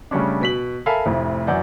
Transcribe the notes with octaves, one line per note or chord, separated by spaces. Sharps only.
C#3 G3 A3 C#4 D4
B2 B6 F#7
A4 A#4 E5 F5 G#5 B5
F1 F2 A2 E4
F#2 E3 D5 F#5 G6